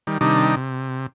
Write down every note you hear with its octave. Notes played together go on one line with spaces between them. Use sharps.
D#3 G3
C3 D#3 G3 D4 D#4
C3